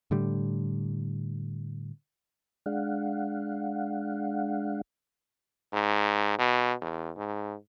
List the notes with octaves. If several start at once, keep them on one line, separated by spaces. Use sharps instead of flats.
A2 D3 G3
G#3 D4 F5 F#5
G#2
B2
E2
G#2